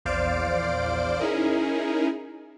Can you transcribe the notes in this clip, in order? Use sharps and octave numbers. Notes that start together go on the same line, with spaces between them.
A#1 E2 C5 D5 F5 D7
C#4 D#4 E4 G#4 A#4